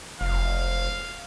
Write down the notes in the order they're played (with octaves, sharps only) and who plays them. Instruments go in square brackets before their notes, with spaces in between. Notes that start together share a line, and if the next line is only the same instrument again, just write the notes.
[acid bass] F1 [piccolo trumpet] F5